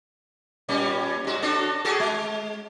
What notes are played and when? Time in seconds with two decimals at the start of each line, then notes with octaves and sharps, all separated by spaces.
0.69 A#2 G3 C#4
1.24 G#2 F#4
1.42 D4 F#4 A4
1.85 F#4 G#4 A4
2.00 G#3